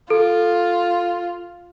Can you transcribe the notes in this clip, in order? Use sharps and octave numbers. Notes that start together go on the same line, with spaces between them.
F4 A4